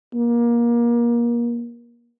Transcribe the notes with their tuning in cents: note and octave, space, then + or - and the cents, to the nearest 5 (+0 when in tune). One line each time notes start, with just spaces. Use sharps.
A#3 +25